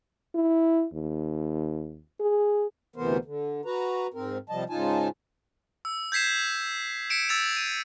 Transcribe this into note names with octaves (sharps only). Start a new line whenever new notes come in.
E4
D#2
G#4
D2 C3 E3 B3 A#4 C5
D3
F#4 B4 A#5
G#2 C4 A#4
C3 F3 G3 D#5 A5
G#2 C#3 D#4 F4 G#5 A5
E6
G6 G#6 B6 C7 E7
B6 C#7 D7 E7
E6 A6 D7 F7
D#7